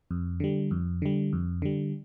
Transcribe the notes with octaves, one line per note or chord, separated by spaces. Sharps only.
F2
D3 G3
F2
D3 G3
F2
D3 G3